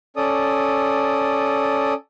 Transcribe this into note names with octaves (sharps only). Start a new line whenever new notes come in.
C#4 A4 D5 D#6